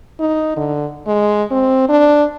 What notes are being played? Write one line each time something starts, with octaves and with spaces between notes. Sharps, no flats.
D#4
D3
G#3
C4
D4